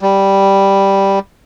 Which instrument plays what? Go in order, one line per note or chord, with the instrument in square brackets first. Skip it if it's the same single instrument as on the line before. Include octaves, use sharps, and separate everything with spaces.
[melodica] G3